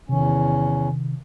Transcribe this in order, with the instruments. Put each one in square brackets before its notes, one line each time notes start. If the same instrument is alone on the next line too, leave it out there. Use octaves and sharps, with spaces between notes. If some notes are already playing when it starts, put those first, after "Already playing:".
[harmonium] E2 C#4 [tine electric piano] C3 D#3